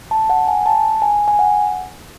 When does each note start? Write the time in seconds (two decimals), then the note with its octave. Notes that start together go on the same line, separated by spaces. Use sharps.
0.11 A5
0.30 F#5
0.48 G#5
0.66 A5
1.02 G#5
1.28 G#5
1.39 F#5